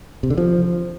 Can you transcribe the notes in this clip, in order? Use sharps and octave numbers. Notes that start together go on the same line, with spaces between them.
C3
D3
F3